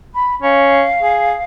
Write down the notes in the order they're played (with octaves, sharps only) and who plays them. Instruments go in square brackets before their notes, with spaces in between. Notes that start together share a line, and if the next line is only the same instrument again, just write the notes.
[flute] B5
[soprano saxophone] C#4 [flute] F5
[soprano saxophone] G#4